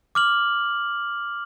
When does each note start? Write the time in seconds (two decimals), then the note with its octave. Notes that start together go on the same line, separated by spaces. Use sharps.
0.15 D6 F6 F#7